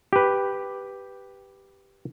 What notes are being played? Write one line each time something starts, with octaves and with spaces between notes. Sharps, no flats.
G4 B4